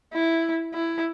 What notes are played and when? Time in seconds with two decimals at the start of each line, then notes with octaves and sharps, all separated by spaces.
0.13 E4
0.74 E4